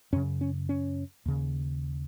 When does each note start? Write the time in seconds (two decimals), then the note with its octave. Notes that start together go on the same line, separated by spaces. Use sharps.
0.13 F#2 C#4
0.16 C#3
0.41 C#4
0.69 C#4
1.25 D#2 C#3